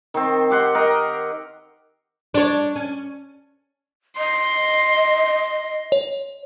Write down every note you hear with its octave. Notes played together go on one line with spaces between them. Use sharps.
D#3 C4
G4 F#5 C6
A#4 D#5
D4 C#5
C#4
D#5 C6
C#5